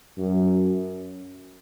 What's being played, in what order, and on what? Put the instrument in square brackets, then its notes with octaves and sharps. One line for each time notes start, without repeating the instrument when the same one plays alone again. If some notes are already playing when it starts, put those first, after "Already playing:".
[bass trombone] F#2